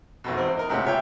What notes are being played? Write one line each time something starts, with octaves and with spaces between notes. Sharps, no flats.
G#1 F2 B2
E2 C4
D#4 A#4
C#2 A2 C3 F#5
F4 G4 C#5 E5 G5